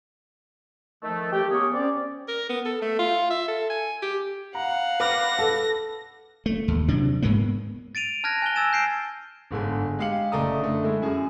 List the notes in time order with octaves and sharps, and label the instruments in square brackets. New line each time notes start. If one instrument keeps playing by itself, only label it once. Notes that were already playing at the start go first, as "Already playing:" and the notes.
[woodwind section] D#3 F3 A3
G4
A#3 B3 G#4 A#4 C#5
C4 C#4 D5
[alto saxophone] A#4
B3
A4
A3
F4
E5
A4
G#5
G4
[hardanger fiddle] F5 F#5 [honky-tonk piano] A#5
[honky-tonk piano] B4 D6 F6 [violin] A#6
[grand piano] A4
[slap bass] A3
D#2
C3 F#3 D4
G#2 G#3 A#3 B3
[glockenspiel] A6 D7 D#7 F7
A5 F6 F#6 G#6 A#6
G#5 F#6 G7
E6 G#6 A6 E7
G6 C7 D7 E7
[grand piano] G1 G#2 D3 G#5
G#3 G4 F5 C#7 F#7
F#1 A3 D5 D#5 A#5 D#6
D3 A3
G#3 A3 E4
F#2 G#4